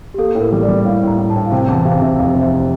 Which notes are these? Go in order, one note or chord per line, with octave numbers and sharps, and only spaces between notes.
G4
A#3 A4
A2
A#4
G3
D5
G3
A2 F5
A2 A#5
A2
A5
A2
F5
C3 G5
E2 A5
C3 F5
C3 E5
F1 F5
C3
E5